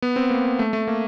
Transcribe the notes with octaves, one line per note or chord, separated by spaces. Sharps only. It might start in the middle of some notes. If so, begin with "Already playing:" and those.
B3
C4
A#3
A3
A3
A#3